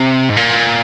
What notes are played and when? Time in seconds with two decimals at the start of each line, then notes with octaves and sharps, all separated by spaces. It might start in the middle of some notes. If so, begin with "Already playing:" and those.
Already playing: C3
0.30 G#2
0.37 A#2